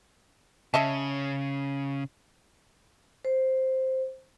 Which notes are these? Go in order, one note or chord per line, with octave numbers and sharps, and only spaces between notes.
C#3 D#5 E5 A5
C5